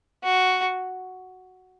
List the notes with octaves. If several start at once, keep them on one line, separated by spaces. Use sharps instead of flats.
F#4